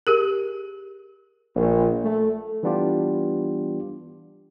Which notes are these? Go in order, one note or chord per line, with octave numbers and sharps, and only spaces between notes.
G4 G#4 A#4
A#1
A3
E3 G3 B3 D4 F4 G4